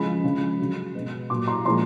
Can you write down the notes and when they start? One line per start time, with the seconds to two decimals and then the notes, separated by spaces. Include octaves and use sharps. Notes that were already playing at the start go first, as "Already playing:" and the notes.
Already playing: C#3 F3 G#3 B5
0.24 C#3 F3 G#3
0.59 C#3 F#3
0.95 B2 G#3
1.30 A#2 F#3 C6 D6
1.48 A#5 C6
1.65 A#2 F3 G#3 A#5 C6